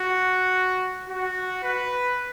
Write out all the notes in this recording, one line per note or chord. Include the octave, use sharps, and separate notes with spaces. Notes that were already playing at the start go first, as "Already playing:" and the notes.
Already playing: F#4
F#4
B4